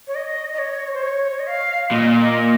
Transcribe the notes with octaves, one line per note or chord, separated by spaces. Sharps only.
C#5
D#5
D#5
C#5
C5
C#5
C#5
D#5
F5
A#2 D#5
D#5